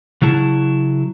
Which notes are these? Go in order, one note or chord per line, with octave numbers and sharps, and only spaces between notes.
C#3 F#3 E4 A5